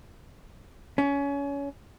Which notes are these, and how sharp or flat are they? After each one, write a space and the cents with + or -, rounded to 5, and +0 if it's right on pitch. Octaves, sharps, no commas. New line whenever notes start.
C#4 +25